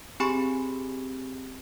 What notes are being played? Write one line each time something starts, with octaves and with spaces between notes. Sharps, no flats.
C4 G4 G#4 G#5 B5 C#6